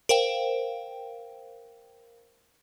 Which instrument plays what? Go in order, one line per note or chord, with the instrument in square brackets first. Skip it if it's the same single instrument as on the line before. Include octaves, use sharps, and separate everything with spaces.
[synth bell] A#4 C5 F5 G5